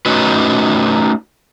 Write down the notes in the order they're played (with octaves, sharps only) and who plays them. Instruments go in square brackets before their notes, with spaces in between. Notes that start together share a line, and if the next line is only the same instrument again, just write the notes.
[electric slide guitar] A3 C#4 D#4 F#4 B4